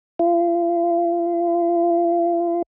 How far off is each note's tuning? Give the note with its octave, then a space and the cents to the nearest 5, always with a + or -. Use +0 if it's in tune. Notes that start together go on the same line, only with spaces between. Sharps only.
F4 -35